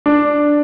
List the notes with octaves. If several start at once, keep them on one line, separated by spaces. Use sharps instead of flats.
D4